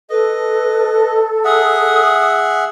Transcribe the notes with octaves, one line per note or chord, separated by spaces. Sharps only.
A4 B4 D#5
G#4 E5 F#5 D#6